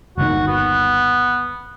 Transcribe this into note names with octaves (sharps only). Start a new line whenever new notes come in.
G1 D#2 D#3 F#4
B3